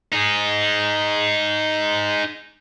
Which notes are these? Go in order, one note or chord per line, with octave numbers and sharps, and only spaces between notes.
D#4 G#4